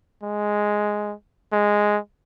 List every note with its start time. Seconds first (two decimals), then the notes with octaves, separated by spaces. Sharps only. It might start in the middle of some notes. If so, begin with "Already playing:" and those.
0.23 G#3
1.53 G#3